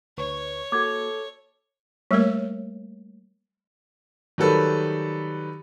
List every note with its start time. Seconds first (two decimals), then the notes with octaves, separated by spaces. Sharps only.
0.18 D2 B4 C#5 C#6
0.72 A#3 F#4 A4 D6 G#6
2.11 G3 A3 A#3 A#4 C#5
4.38 D#3 F#3 G3 A4 B4